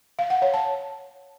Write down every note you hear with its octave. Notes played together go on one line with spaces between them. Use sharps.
F5
F#5
C#5
A5